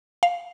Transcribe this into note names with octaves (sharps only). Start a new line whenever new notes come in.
F5